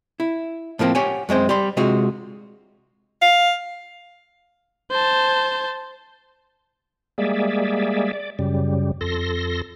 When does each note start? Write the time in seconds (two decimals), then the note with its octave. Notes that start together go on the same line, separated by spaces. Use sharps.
0.20 E4
0.79 A2 F3 A#3 C4
0.95 G4 C#5 F#5 G#5
1.29 F#2 G#3 C4 C5
1.49 G3 C6
1.77 C3 G#3 F4 F#4
3.22 F5
4.91 C5 A5
7.18 G3 G#3 A#3 G#4 D5 E5
8.13 D5
8.39 F#2 C#3 G3
9.01 F2 A4 C6 A#6